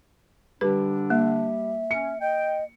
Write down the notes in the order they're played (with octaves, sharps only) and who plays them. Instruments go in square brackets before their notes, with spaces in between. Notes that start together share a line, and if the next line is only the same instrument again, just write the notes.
[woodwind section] D3 D4 [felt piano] G3 [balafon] B4
[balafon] A#3 [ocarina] E5
[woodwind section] C#4 [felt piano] C#7
[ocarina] D#5 [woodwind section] G5